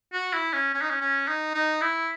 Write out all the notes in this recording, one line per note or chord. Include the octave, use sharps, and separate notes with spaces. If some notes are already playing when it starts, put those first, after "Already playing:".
F#4
E4
C#4
C#4
D#4
C#4
C#4
D#4
D#4
E4